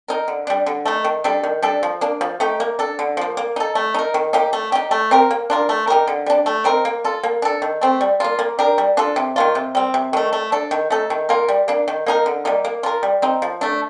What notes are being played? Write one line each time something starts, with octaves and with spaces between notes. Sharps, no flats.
D#4 A#4
D3
G3 D4
D3
A3 D#4
D#3
G3 D4 A4
D#3
G3 D4 A4
F3
A#3 D4
F3
A3 D#4 G4
A#3
D4 A4
D3
F3 A#3
A#3
D#4 A4
A3
D#4 A#4
D#3
A#3 D#4 G4
A3
D#4 G4
A3
C4 G4 A#4
A#3
D4 F4 A#4
A3
D#4 G4 A#4
D3
G3 D4
A3
C4 D#4 A#4
A#3
F4 A4
A#3
D4 A4
D#3
A3 C4
G3
A#3 F4
A#3
D4 G4 A#4
G3
D4 F4 A4
C3
D#3 A#3 F4
C3
G3 C4
C3
D#3 A3
A3
D4 A4
D#3
A3 D#4 A4
D#3
A#3 F4 A#4
G3
A#3 D4
D#3
A#3 D#4 A#4
D3
G3 A#3 D#4
A#3
F4 A#4
G3
C4 D#4
F3
A3 D4